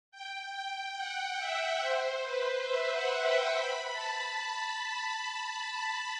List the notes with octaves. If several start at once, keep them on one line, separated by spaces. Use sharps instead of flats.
G5
G5
F#5
E5
C5
B4
E5
F#5
G5
B5
A5